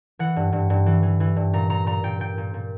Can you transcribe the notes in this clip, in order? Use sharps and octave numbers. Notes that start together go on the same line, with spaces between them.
E3 F#5
G2
G2
G2
E3
E3
E3
G2
A#2 A#5
A#2 A#5
A#2 A#5
A#2 G5
A#2 G5
A#2
A#2